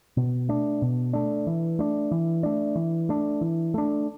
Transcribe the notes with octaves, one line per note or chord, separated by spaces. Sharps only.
B2
A3 D4
B2
A3 D4
E3
A3 D4
E3
A3 D4
E3
A3 D4
E3
A3 D4